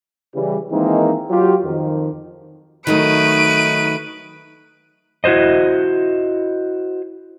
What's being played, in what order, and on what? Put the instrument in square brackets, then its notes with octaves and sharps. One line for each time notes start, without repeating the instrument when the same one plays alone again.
[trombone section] C#3 E3 G3
D#3 E3 G#3 A#3 C4 D#4
F#3 F4 G4
F2 D#3
[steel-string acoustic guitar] D#3 F#3 A3 [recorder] D#4 [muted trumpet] B4 [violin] D7 D#7
[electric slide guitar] E4 F#4 B4 C5 D#5